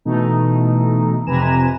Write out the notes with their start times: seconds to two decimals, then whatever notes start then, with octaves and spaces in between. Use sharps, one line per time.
0.05 B2 E3 A3 D#4
1.27 F2 C3 B4 G#5 A#5 E7